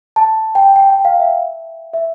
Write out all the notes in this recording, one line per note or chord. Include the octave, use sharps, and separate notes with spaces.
A5
G5
G5
G5
F5
E5
E5